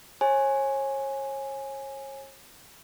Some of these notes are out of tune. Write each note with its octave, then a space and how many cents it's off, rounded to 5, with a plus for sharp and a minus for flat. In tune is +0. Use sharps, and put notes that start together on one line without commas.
G#4 +0 C#5 -35 G#5 +0